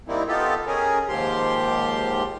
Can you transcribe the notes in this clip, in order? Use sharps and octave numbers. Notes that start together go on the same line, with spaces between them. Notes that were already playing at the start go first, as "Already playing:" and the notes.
D#3 G3 A#3 C4 D#4 E4
B3 D#4 F4 G4 A4
C#4 G#4 A#4
D#2 G#2 F3 G4 C6